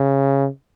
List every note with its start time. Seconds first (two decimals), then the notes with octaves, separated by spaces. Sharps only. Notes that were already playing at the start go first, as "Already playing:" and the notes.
Already playing: C#3